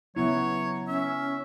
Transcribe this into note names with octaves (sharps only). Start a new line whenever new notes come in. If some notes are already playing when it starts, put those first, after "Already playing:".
C#3 F#3 B3 E4 C#5
C#4 E5